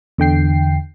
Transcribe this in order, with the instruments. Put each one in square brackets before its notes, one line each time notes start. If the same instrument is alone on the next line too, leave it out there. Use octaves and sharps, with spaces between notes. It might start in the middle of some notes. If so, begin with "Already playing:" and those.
[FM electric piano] E2 D3 G5 C7